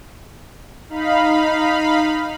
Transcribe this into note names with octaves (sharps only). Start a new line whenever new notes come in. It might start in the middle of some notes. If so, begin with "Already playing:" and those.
D#4 F5 B5